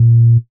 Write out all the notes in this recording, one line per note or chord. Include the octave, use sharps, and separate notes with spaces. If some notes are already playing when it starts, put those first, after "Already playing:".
Already playing: A#2